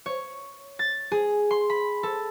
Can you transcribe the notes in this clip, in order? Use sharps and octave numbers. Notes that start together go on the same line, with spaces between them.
C#5
A6
G#4
C6
B5
A4